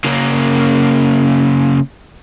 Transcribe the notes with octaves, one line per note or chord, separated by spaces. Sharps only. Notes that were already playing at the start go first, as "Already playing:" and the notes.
C#3 A#3